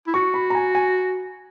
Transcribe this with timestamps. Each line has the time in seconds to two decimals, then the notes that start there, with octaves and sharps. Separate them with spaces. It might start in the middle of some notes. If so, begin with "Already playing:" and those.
0.07 E4
0.14 F#4 C#6
0.34 B5
0.50 A#5
0.55 G#5
0.75 G#5